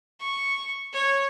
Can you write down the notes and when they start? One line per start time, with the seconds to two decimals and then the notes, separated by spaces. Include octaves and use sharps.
0.21 C#6
0.93 C#5